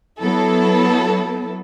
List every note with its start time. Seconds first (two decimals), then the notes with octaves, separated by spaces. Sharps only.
0.21 F#3 B3 E4 A4